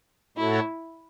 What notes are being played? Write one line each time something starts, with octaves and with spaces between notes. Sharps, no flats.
A2 A3 E4 F#4 A4 C#5